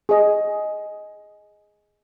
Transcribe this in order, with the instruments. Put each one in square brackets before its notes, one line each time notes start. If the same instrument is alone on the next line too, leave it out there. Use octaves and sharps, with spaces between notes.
[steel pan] G#4 D#5